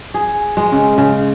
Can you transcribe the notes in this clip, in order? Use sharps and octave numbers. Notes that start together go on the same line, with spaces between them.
G#4
G#3
C#3
C#3